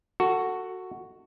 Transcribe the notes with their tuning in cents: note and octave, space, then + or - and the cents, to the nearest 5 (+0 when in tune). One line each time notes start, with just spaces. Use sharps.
F#4 +0 A4 +25